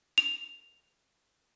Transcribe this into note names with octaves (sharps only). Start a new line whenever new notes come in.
F7